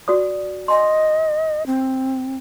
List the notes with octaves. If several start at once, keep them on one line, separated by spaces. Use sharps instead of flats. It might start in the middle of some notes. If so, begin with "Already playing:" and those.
F#4 D5 D#6
D#5 G#5 C6
C4